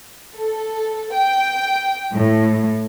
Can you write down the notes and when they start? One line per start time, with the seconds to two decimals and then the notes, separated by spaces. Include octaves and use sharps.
0.36 A4
1.13 G5
2.13 A2